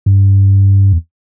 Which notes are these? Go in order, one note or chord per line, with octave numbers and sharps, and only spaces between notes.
G2
E2